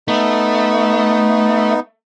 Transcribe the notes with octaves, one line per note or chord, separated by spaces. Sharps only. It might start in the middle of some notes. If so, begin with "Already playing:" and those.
A3 B3 D#4